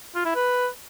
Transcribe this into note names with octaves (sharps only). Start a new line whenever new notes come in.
F4
E4
B4